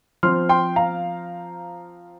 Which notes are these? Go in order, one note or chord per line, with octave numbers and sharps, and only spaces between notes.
F3 C4 C6 F6
G5 C6
F5 A#5